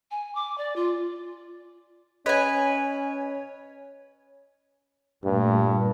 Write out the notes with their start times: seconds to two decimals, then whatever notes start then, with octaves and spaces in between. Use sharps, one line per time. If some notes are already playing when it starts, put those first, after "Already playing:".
0.11 G#5
0.35 D6
0.58 D5
0.76 F4
2.26 C#4 B4 C#5 D#5 G#5
5.24 G2 A#2 G3 A3